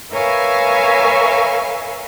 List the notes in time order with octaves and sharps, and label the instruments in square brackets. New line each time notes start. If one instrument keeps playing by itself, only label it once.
[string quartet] A#4 B4 C#5 E5 F5 G#5